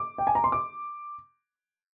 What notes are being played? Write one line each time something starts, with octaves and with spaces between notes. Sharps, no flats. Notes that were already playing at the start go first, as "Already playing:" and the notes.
Already playing: D6
G5
G#5
A#5
C6
D6